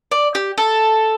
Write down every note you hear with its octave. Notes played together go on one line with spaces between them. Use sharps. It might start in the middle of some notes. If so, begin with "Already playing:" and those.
D5
G4
A4